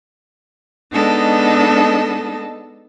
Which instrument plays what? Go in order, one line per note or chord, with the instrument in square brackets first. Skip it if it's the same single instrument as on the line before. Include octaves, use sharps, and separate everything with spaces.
[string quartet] G#3 B3 D4 D#4 A4 D#5